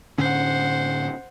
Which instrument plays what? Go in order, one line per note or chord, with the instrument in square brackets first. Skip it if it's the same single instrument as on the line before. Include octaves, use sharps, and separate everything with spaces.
[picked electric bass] A2 D3 C#4 [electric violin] C5 F#5